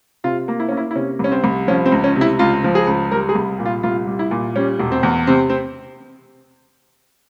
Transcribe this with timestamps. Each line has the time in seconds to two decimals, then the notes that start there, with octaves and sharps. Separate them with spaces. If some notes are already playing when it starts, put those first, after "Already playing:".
0.24 C3 F4
0.48 A#3
0.60 E4
0.69 A#3 C#4
0.77 E4
0.91 E4
0.95 C3 C#4
1.19 C2 C#4
1.32 C4
1.44 C2
1.68 F3 C#4
1.86 C4
1.92 C#2
2.04 C#4
2.16 C3
2.21 E4
2.39 C#2 F4
2.64 F3
2.75 G#4
2.87 C#2
3.11 G3 A#4
3.29 G#4
3.35 C2
3.59 A#2
3.66 F4
3.83 C2 F4
4.07 G3
4.19 E4
4.31 A#2
4.56 G3 C#4
4.79 E1
4.92 C4
5.03 E2
5.27 C3 C4
5.50 C4